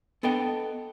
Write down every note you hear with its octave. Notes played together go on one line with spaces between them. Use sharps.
B3 D4 A4 D#5 G5